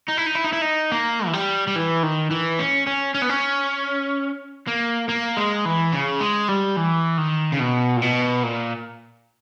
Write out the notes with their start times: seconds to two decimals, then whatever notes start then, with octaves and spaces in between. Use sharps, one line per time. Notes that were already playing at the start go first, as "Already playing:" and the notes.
0.08 D#4
0.17 E4
0.26 D#4
0.35 E4
0.44 D#4
0.53 E4
0.62 D#4
0.92 A#3
1.26 E3
1.33 G3
1.67 G3
1.76 E3
2.03 D#3
2.31 E3
2.59 C#4
2.87 C#4
3.14 C#4
3.22 B3
3.29 C#4
4.68 A#3
5.09 A#3
5.37 G#3
5.65 E3
5.92 C#3
6.20 G#3
6.48 G3
6.76 E3
7.18 D#3
7.52 C#3
7.60 B2
7.97 A#2
8.02 B2
8.43 A#2